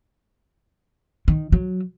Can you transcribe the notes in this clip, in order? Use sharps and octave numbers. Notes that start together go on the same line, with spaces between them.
D#3
F#3